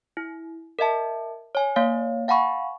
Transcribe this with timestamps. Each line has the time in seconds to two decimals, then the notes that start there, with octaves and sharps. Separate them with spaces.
0.17 E4
0.79 A#4 D#5 E5 A5
1.55 C#5 G#5
1.76 A#3 C#5 F5
2.28 F5 F#5 G#5 B5 C#6